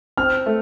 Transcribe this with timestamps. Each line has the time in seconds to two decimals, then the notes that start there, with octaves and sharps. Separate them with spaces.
0.17 C4 F6
0.46 A3